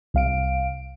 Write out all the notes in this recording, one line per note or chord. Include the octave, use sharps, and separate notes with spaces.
C2 F5 D7